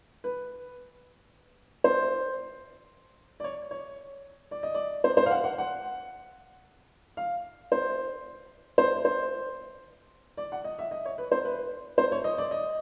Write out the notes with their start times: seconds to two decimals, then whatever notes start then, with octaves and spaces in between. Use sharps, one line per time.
0.24 B4
1.84 C5
3.40 D5
3.44 C#5
3.71 C#5
4.51 D5
4.63 D#5
4.74 D5
5.04 C5
5.17 C5
5.26 F5
5.30 F#5
5.44 F#5
5.58 F#5
7.17 F5
7.72 C5
8.78 C5
9.05 C5
10.37 D5
10.52 F#5
10.64 D#5
10.79 E5
10.91 D#5
11.05 C#5
11.18 B4
11.32 C5
11.45 B4
11.98 C5
12.12 C#5
12.24 D#5
12.38 D5
12.51 D#5